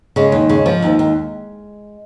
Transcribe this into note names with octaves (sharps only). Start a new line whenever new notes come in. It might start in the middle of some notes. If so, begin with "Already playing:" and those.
C#3 G#3
D#2
C#3
F3
D#2
D#2